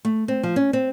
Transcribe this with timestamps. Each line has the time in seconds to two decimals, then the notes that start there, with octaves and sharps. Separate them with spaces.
0.05 A3
0.28 C4
0.43 F3
0.56 C#4
0.73 C4